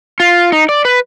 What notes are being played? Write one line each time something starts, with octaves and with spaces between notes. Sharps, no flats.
F4
D#4
D5
B4